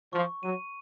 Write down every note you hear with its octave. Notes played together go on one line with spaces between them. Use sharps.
F3 C#6
F#3 D#7